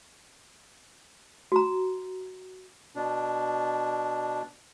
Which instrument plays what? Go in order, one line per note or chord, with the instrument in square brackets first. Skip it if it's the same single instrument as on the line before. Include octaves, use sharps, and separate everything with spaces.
[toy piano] F#4 A#5
[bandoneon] B2 D4